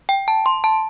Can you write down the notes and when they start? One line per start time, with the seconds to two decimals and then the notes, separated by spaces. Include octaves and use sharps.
0.09 G5
0.28 A5
0.46 C6
0.64 A5